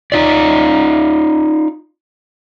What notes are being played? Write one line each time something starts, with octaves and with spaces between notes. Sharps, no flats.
D#4 F4 D5